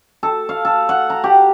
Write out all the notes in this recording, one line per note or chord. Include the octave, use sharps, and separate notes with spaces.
A4
F5
A4
F#5
A#5
G4